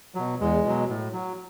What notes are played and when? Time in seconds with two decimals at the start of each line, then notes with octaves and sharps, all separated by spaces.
0.15 B2 F#3
0.41 E2 G#3
0.65 B2 F#3
0.89 A2
1.13 F#3